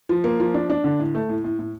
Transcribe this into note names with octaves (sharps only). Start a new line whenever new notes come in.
F3
A#3
F3
D4
D4
D3
A2
A3
A2
A2
A2